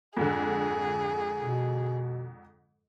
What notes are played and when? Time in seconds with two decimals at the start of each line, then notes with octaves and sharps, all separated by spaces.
0.17 F2 G#2 D3 G#4
1.40 B2